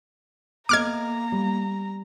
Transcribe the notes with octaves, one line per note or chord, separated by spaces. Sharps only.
A#3 B3 A4 D#5 A#5 D6 F6 G#6
G3